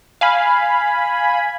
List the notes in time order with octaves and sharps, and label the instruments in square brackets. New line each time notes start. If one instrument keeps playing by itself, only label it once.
[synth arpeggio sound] F5 G#5 B5